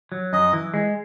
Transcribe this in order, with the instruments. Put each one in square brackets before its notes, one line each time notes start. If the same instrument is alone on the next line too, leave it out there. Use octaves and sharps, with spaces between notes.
[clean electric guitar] F#3
[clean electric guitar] F#2 [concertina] D#5
[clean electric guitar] E3
G#3